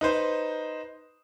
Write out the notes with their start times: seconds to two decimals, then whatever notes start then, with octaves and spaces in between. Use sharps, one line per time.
0.01 D#4 B4 C5